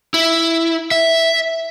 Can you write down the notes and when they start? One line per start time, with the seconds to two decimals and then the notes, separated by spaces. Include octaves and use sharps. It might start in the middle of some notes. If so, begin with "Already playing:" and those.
0.14 E4
0.91 E5